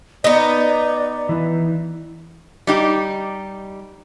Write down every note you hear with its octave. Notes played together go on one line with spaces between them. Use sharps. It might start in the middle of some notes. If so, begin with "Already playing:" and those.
B3 D#4 D5
E3
G3 D#4 G4